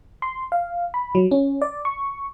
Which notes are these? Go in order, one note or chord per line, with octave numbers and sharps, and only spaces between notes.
C6
F5
B5
F#3
C#4
D5
C#6